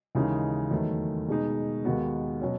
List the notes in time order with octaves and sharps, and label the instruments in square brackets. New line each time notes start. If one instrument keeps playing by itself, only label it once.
[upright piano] D#2 C#3 E3 G#3 D#4
E2 D#3 F#3 A3
B2 G#3 D#4
D#2 D#3 G#3 B3 F#4
B2 F#3 C#4